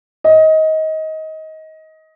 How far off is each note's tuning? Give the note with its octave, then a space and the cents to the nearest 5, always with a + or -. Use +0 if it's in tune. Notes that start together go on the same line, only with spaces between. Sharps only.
D#5 +20